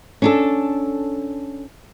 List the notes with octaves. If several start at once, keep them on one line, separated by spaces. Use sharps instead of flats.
C#4 D4 A4